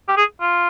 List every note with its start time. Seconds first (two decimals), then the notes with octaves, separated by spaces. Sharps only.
0.08 G4
0.17 G#4
0.41 F4